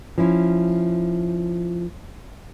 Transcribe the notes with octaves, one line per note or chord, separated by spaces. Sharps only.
F3 C#4 E4